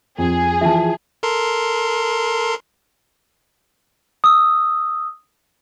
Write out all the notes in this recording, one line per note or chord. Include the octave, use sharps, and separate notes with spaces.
F2 G#4
E3 F3 E5 A5
A4 A#4 C6
D#6 E6